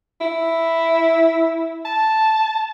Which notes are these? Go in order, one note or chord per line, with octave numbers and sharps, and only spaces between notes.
E4
A5